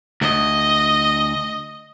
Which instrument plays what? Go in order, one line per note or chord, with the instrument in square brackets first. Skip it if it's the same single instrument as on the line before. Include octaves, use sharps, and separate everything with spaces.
[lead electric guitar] D2 [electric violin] D#5